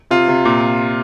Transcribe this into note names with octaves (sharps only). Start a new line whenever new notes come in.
C3 F4
C3
A#2